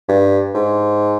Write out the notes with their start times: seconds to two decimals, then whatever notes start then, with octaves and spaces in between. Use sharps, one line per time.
0.09 G2
0.55 G#2